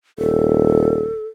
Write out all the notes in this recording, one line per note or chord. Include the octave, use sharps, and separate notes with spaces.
D#1 A4